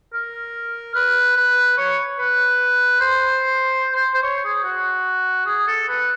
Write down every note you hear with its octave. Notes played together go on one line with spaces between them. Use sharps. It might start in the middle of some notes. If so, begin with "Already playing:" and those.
A#4
B4
B4
C#5
B4
C5
C5
C5
C#5
G#4
F#4
G#4
A4
B4